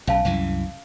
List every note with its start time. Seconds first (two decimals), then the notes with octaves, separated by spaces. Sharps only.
0.07 B1 C#4 F5 A5
0.25 C2 F#2 E3